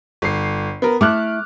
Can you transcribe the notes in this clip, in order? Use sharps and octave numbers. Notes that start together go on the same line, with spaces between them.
G1 C7
B3 A#4
A3 E4 D6 F6 F#6